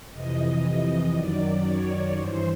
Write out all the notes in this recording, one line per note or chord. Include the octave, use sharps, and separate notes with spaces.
F2 C3 E3 D#5
F#2 D#3 F#3 D5
C#5
G2 E3 C5